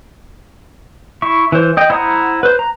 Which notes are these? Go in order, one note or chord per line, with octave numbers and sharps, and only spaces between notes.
E4 E5 C#6
E3 C5
D#5 G5
E4 C5 F#5 A#5 D#6
B4 C5
A#5